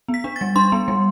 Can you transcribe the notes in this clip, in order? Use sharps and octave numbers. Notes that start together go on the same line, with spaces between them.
B3
B6
D4
A6
G3
D4 C6
B3
G3